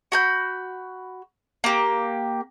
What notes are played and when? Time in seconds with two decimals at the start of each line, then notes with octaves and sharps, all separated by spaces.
0.12 F#4 B5 G6
1.64 A#3 G4